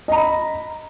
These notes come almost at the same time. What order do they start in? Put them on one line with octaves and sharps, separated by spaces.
D#5 A#5 B5